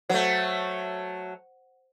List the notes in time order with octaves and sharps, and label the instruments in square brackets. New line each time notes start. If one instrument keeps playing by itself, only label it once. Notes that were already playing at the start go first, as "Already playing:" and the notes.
[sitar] F#3 A3 [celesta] C5 F#5